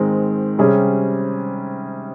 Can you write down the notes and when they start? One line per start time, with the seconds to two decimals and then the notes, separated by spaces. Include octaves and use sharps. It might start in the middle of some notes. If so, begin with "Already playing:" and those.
Already playing: G#2 D#3 G#3 C4
0.58 C3 G3 C#4 G#4